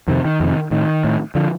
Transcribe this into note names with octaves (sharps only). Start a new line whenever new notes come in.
F2 C3 D#3
D#3
F2 C3
A2 D#3
A2
D3 F3